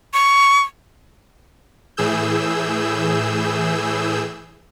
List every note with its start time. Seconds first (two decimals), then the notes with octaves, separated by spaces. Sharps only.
0.13 C#6
1.97 A2 E3 G#4 E6 G6